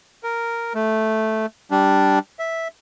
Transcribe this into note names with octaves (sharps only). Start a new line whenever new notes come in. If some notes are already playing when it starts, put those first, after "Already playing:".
A#4
A3
G3 D4
E5